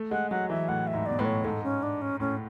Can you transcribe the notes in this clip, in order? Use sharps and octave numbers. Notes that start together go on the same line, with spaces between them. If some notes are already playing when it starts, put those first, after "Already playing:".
Already playing: A3
G#3 F#5
F#3 F#5
E3 E5
A2 F#5
E5
G#2
B2 D5
A2 B4
C#5
G#2 A4
C#4
D4
C#4
A2 C#4